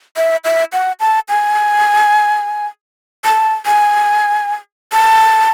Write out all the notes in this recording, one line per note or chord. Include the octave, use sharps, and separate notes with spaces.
E5
E5
F#5
A5
G#5
A5
G#5
A5